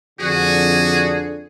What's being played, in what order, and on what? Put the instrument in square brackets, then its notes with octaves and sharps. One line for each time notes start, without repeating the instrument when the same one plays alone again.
[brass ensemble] F2 D3 [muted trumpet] F#4 [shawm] G#4